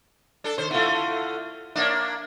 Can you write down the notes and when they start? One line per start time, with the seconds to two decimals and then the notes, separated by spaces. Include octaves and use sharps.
0.44 D4 A4
0.58 D#3 C5 C#5
0.71 D3 A3 E4 F4
1.75 A#3 D4 C#5 E5